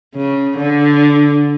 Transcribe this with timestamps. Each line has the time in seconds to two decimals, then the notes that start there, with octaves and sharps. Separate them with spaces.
0.16 C#3
0.58 D3